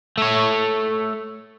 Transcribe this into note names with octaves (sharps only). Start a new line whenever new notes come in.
A3 C#5